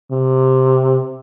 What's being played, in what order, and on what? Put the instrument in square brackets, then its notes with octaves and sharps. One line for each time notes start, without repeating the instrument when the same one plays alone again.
[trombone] C3